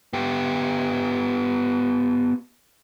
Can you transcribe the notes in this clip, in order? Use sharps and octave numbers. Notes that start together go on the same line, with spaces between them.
B3 G4